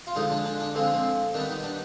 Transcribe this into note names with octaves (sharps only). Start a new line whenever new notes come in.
F4
D3 F3 G#3 D#4
D4
D4
D4
D3 F3 G#3 C4
C4
D#3 G3 B3 D4
D#4
D4